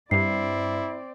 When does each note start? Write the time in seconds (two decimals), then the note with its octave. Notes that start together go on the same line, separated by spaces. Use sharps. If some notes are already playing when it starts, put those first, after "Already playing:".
0.11 G2 C4 E4 D5 C7